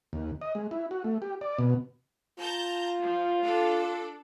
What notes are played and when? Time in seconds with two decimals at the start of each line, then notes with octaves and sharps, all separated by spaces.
0.13 D#2
0.41 D#5
0.55 G#3
0.71 E4
0.91 F#4
1.04 A3
1.22 G4
1.41 D5
1.59 B2
2.39 F4 A5 A#5 G6
3.02 F3
3.42 D4 A4